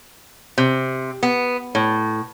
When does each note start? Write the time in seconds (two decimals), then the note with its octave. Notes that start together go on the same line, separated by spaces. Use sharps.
0.58 C3
1.23 B3
1.75 A2